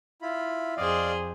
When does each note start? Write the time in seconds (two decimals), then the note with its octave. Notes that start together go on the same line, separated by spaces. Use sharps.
0.22 E4 F4 B5
0.77 F2 G#4 C5 D5 D#5 F5